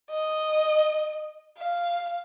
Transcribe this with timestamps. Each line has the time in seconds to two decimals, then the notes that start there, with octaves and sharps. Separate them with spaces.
0.11 D#5
1.58 F5